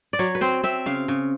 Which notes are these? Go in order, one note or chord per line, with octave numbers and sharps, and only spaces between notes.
D5
F#3 C#5
B4
C4 C5
C4 E5
C#3 F5
C#3